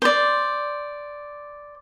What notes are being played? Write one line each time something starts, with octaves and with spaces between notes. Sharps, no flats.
C5 D5